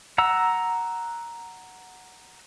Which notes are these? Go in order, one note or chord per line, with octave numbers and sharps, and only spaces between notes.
F#5 A#5 E6